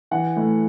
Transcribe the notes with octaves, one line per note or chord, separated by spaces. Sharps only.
E3 F#5
A2